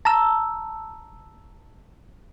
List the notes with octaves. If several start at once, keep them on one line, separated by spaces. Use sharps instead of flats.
A5 A#5 E6